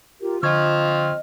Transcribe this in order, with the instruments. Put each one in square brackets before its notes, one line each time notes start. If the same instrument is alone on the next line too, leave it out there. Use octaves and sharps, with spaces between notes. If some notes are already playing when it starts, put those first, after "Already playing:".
[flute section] F4 G4 A#4
[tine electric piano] D3 C#6 G#6 [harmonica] F3 C4 F6 [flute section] D#5